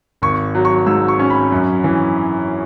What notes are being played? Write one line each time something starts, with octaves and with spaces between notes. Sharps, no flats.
G#1 C#6
F#3
C#6
G#2 E6
C#6
C#4
B5
F#2
E3